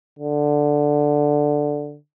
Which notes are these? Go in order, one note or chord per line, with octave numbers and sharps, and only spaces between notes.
D3